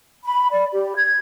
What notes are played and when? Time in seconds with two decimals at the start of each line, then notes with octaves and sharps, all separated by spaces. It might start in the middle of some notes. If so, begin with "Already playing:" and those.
0.25 B5
0.51 D5
0.73 G4
0.96 G#6